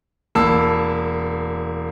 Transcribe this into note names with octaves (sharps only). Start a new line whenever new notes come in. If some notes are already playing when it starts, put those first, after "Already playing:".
E1 A#3 A5 B5 E6